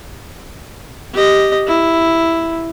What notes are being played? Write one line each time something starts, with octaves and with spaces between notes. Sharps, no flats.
G4 D#5
E4